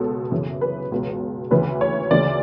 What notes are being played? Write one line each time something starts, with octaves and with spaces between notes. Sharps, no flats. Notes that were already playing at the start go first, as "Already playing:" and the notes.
Already playing: C#2 B2 A4
F#2 C#3 E3
B4
C#2 B2
D2 C#3 E3 B4
C#5
D2 C#3 E3 D5